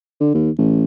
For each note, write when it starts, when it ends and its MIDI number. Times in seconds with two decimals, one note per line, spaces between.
0.20 0.34 50
0.34 0.50 39
0.58 0.85 33